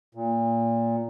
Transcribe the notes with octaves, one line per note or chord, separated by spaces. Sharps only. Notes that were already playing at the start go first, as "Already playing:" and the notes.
A#2